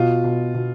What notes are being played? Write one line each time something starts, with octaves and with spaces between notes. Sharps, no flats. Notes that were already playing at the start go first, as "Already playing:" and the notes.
Already playing: B2 F4
B2
B2